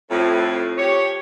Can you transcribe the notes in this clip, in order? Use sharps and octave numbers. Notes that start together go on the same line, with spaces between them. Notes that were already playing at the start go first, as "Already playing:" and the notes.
F2 A2
G4 C#5